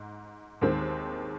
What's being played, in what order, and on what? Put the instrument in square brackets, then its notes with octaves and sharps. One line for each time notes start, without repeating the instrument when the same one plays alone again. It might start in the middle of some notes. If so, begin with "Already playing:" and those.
Already playing: [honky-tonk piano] G#2
D#2 D#3 G#3 C4